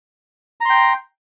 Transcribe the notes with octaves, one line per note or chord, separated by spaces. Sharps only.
G5 A#5 C6